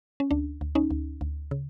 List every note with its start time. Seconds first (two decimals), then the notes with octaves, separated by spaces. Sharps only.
0.20 C#4
0.31 D2 D4
0.61 D2
0.75 C#4 D#4
0.91 D2
1.21 D2
1.51 C#3